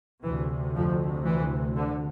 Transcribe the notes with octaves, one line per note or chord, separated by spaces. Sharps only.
D2 C3 E3
F2 F3
E3
D3